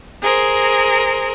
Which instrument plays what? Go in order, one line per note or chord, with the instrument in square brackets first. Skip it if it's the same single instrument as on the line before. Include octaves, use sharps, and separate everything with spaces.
[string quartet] G#4 A#4 C5